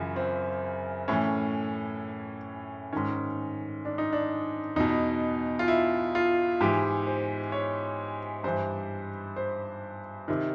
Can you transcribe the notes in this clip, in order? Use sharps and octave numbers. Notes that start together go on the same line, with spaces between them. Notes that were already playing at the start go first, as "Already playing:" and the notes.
Already playing: F#2 C#3 E3 F4
C4
A2 E3 C#4
G#2 D#3 C#4
D4
D#4
D4
E2 B2 D#4
F4
E4
F4
G#2 E3 G4
C5
C#5
G2 E3 C5
C5
C3 D#3